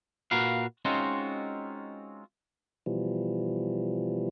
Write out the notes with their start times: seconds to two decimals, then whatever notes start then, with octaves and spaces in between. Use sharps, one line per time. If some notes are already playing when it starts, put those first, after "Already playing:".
0.31 A#2 A#3 F#4 A#4 B4 F5
0.85 G#3 C4 C#4 D#4 F4 F#4
2.86 B2 E3 F3 G3